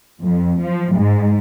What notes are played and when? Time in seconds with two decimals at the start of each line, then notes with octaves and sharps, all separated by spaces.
0.22 F2
0.61 F3
0.95 G#2